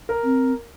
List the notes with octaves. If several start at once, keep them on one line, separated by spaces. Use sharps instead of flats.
A#4
C4